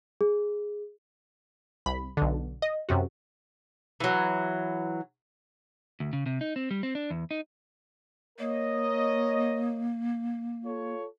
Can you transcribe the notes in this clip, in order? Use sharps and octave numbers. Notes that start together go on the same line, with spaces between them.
G#4
C2 B5
B1 D3
D#5
F#2 C3 F#4
E3 F#3
D2
C#3
C3
D#4
C4
G3
C4
D4
E2
D#4
A#3 A#4 C#5 D#5
F4 A4 C#5